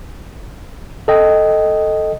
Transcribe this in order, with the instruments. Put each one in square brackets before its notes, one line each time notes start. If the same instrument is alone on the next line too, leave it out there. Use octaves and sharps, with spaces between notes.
[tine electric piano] A4 D#5 G5